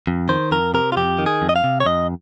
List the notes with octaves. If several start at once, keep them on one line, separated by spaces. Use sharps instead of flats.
F2
D#3 C5
F2 A#4
C3 A#4
F4
F2 G4
D#3
G#4
F2
D#5
F5
C3
C#5
F2 D#5